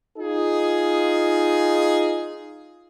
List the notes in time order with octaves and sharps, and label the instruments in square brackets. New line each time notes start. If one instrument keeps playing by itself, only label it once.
[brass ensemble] D#4 F4 G#4